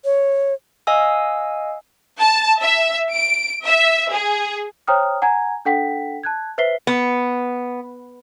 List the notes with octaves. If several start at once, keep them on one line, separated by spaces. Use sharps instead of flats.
C#5
D#5 F5 G#5 E6
A5
E5
D7
E5
G#4
C5 C#5 G5 A#5 D#6 F6
F#5 G#5 A#5 G#6
D4 A4 F#5 G5 B6
A5 F#6 G#6
B4 C5 E5 B6 C7 G7
B3